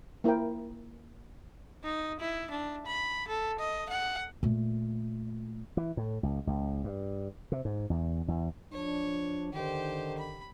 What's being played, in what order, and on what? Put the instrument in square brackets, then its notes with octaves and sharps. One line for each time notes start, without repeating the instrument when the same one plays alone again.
[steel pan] A#3 E4 A#4 C5 G5
[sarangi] D#4
E4
D4
B5
A4
D#5
F#5
[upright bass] A#2 A3
[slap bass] E3
A2
C#2
C#2
G2
C3
G#2
E2
E2
[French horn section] F3 D4 [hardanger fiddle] C#5
[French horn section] D3 D#3 [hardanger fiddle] G4 C5
[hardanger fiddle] B5